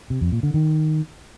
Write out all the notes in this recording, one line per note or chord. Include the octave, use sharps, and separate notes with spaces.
C3
F2
A#2
D3
D#3